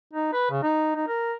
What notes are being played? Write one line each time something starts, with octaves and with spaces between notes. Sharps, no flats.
D#4
B4
C#3
D#4
D#4
A#4